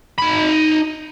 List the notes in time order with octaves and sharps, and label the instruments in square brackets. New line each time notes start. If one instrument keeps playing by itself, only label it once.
[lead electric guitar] D#4 B5